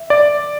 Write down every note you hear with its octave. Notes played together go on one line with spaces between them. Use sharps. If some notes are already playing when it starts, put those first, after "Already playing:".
Already playing: E5
D5